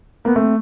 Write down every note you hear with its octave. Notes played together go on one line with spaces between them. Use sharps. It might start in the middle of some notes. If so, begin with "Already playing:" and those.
A#3 B3
A3 C4